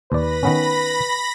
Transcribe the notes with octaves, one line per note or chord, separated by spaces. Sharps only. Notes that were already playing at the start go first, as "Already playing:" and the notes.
D#2 B4 D5 B5 A#6
D#3 B3 C#4